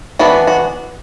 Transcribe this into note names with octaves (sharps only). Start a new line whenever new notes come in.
E3 B3 D4 F#4
F#4